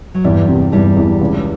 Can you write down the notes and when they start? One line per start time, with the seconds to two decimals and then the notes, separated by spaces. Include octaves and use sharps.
0.14 F#3
0.24 E2 G2 G3
0.48 C3
0.72 E2 G2 G3
0.97 E2
1.21 C#2